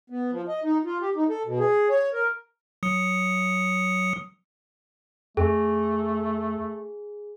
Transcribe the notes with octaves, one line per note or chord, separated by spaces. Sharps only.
B3
F3
D#5
D#4
F4
G4
D#4
A4
B2
G#4
C#5
A#4
F#3 D#6 C#7
F2 A3 G#4